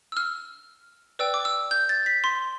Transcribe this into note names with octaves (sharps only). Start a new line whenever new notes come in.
E6
F6
B4 D5 G5 E6
D6
E6
G6
A6
B6
C6